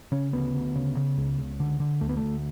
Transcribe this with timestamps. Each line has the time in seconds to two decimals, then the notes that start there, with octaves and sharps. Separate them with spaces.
0.12 C#3 C#4
0.33 D2 B3
0.54 D2
0.75 C#3
0.97 C#3
1.17 C#2
1.38 C#2
1.60 D3
1.80 D3
2.01 D2 A3
2.09 B3
2.17 A3
2.22 D2